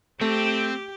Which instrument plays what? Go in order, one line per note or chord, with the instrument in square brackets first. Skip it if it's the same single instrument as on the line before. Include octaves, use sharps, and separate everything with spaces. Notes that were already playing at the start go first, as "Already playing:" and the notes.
[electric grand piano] A3 [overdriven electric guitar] C4 [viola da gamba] G4